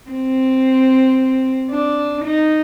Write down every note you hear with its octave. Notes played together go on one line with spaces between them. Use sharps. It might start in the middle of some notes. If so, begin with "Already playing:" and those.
C4
D4
D#4